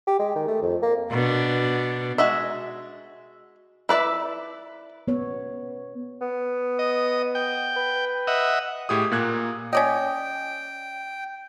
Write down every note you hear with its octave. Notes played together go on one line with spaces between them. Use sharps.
G4
G#3
D#3
A3
F2
A#3
B2 D4
G#3 F#4 D#5 E5
E4 B4 D5 E5
B3 C#5
B3
D#5
G5
B4
D#5 E5 F#5
A2 G4 G#4 D#6
A#2 A#3 F#6 G#6
C#4 D5 D#5 G5